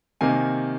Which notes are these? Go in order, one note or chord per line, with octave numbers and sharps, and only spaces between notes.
C3 D#3 A#3 G#5